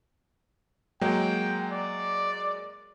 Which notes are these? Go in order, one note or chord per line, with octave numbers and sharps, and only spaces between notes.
F#3 G#3 A#3 G5
D5